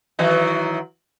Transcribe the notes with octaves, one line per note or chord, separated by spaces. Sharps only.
D#3 E3 F#3